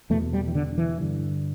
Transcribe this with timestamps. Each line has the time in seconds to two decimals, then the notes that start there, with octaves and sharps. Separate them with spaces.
0.10 E2 B2 A3
0.33 G3
0.48 E3
0.55 D3
0.78 E3
1.00 G2 D3